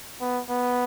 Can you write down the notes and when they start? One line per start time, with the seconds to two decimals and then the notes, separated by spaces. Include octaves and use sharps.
0.21 B3
0.49 B3